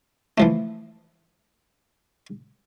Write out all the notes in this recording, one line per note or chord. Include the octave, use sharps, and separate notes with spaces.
E3 F3 A3